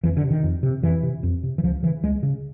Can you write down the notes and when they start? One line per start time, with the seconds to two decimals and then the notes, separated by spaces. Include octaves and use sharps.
0.04 F2 E3
0.17 D3
0.23 C3
0.31 D#3
0.44 F2
0.63 C3
0.83 F2 E3
1.03 C3
1.23 F2
1.43 C3
1.58 E3
1.63 C#2 F3
1.83 C#3 E3
2.03 C#2 G#3
2.23 C#3